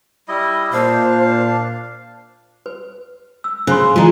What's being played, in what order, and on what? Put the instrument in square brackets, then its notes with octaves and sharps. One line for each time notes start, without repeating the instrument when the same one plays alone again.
[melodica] G3 E4 D#5
[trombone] A#2 [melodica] D4 F5 [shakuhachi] C5
[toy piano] B4
E6
[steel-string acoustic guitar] C#3 [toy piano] C5 C6
[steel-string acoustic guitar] E3 G#3 [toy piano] F4 D#5 A#5